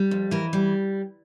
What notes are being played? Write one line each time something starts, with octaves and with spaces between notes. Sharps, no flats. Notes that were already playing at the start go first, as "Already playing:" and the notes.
Already playing: G3
F2
E3 A#4
G3